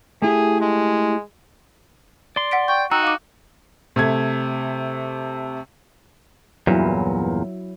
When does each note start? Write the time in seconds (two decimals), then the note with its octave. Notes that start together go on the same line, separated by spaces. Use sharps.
0.22 A3 E4 G4 G#4
0.61 G#3
2.36 D5 C6
2.51 F#5 B6 D7
2.68 G5 C#6
2.91 D#4 F#4 G5 A#5 E6
3.03 F5 D6
3.96 C3 A3 G#6
6.67 E2 G2 A#2 F#3 E4